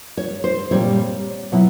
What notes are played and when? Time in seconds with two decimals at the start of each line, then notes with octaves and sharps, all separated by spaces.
0.17 C#5
0.44 C5
0.71 A#2 G3 C4 C#5
1.52 B2 F#3 B3 E4